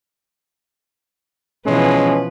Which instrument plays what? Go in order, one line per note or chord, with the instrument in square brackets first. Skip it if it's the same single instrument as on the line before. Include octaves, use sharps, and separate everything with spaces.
[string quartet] B2 E3 F3 [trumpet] G#3 [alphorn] C#4 [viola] B4